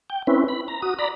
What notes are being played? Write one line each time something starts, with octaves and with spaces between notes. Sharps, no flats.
G5
C4 C#4 E4 B4
B5
A#5
F#4 D#6
D5 A#5 B5